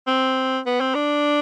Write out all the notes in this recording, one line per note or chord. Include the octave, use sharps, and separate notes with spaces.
C4
B3
C4
D4